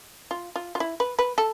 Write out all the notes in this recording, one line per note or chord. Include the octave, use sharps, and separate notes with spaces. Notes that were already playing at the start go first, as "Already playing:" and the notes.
F4
F4
F4
E4
B4
B4
A4